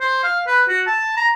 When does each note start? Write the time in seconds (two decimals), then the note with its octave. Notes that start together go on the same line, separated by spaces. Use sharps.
0.01 C5
0.24 F5
0.47 B4
0.68 F#4
0.87 A5
1.17 A#5